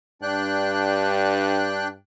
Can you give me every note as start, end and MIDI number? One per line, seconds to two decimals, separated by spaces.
0.22 1.96 43
0.22 1.88 62
0.22 1.88 79
0.22 1.88 90